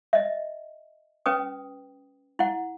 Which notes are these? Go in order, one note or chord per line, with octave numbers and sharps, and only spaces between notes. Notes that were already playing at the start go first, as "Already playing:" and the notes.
D#5 E5
C#4 B4 G5 D#6
E4 F#5